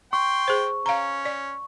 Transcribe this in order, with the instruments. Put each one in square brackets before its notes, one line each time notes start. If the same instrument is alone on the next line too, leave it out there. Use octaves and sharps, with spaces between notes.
[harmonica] G5 C6 [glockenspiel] C#6
[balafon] G#4 C5
[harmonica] C#4 [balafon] F5 A#5
[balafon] D5